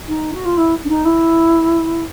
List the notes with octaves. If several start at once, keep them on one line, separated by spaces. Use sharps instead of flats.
D#4
F#4
F4
E4
D4
D#4
E4